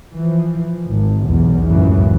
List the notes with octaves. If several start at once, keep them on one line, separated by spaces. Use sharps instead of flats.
E3 F3
G#1
B1 E2
C#2 F#2 A2 C#3 E3